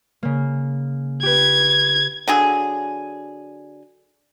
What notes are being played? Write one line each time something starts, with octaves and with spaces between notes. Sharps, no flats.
C#3 A#3
G4 B4 G#6
D3 F#3 G#4